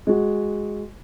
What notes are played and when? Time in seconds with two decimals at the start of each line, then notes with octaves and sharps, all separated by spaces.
0.07 G#3 F#4